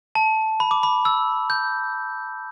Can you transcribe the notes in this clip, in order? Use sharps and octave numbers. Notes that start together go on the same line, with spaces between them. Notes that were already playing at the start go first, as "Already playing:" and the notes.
A5
B5
D6
B5
E6
G6